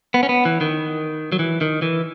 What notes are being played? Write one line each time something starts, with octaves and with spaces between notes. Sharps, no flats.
B3
C#4
B3
E3
D#3
F#3
E3
D#3
E3